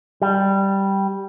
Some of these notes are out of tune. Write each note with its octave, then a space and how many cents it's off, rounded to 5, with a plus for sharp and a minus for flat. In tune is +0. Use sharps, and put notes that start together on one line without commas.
G3 -5